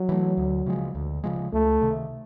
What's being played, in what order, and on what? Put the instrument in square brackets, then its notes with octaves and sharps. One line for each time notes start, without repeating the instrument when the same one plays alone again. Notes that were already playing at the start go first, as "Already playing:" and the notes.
Already playing: [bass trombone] F#3
[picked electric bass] E3 A3
D2
C#3 F3 G#3
D2
C#3 F3 G#3
[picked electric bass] C#2 [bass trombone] A3
[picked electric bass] C3 D#3